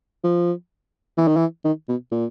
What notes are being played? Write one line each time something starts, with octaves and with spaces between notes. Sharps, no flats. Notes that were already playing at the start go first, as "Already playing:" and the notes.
F3
E3
D#3
E3
D#3
B2
A#2